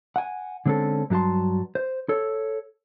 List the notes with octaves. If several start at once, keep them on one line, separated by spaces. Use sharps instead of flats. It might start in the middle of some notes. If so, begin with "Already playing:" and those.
F#5 G#5
D3 G#3 C4 C#4 A4
G2 F#3 D#4 A5 C6
C5
A4 C#5